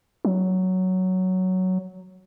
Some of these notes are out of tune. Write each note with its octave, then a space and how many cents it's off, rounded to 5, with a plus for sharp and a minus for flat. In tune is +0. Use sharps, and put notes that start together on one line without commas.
F#3 +5